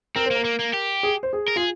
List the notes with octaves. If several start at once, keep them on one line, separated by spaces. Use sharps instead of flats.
C4 A#4
C5
A#3 A#4
A#3
A#3
G4
G#4
C5
G#4
A#4
F4 G#4